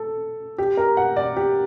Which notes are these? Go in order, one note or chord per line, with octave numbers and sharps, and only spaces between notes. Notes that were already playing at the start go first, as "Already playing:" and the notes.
Already playing: A4
G4
A#4
F#5
D5
G4